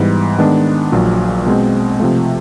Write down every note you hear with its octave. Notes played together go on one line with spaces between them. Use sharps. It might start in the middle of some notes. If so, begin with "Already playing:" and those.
Already playing: G#2 E3 G3 B3
D#3 G#3 B3 D4
A#1 A#2 F#3
B2 G#3 C4
C3 F3 A3